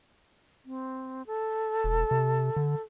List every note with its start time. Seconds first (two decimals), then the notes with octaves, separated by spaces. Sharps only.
0.65 C4
1.27 A4
1.84 E1
2.11 C3
2.56 D3